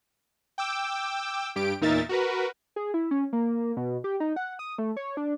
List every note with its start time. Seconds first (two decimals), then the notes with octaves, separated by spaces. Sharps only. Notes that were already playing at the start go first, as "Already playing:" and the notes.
0.58 G5 D6 E6
1.56 G2 G4 D7
1.81 E2 A#2 D#4 A#4 E5 A6
2.09 F#4 A#4 B4
2.76 G#4
2.94 E4
3.11 C#4
3.33 A#3
3.77 B2
4.04 G4
4.20 D#4
4.36 F#5
4.59 D#6
4.78 A3
4.97 C#5
5.17 D4